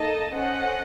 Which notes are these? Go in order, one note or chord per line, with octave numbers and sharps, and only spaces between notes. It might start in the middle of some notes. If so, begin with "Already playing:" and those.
Already playing: A#3 D#4 A4 D#5 A5
C#4 A4 C5 D#5 F#5